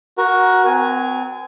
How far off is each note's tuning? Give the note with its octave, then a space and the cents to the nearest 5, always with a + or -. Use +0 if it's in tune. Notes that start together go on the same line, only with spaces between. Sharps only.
F#4 +0 A#4 +15
C4 -40 G#5 +0